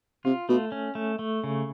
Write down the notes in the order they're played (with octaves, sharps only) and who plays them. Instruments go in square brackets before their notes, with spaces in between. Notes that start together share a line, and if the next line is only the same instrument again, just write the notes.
[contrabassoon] C3 [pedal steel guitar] F4
[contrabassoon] B2 [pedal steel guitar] A3
[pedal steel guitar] C#4
A3
A3
C#3